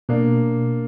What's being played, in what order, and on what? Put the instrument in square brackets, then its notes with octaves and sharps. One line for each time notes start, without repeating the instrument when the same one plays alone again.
[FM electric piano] B2 [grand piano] A#3 D4